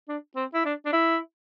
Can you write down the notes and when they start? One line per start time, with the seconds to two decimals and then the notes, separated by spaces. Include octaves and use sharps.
0.08 D4
0.36 C4
0.54 E4
0.65 D4
0.86 D4
0.93 E4